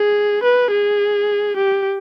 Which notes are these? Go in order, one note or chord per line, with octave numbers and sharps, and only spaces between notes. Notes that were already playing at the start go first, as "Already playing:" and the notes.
Already playing: G#4
B4
G#4
G4